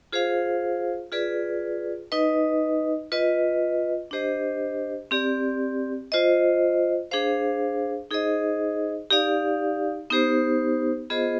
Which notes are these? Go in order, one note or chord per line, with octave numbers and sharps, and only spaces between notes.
F4 G#4 C5 F5
F4 G#4 B4 D5
D#4 B4 D#5
F4 B4 D#5
D4 G4 C5 D#5
C4 G4 D5
F4 C5 D#5
D4 G#4 C5 F5
D#4 G#4 C5 D#5
D#4 G4 D5 F5
B3 D#4 G4 C5
B3 F4 G#4 C5 D#5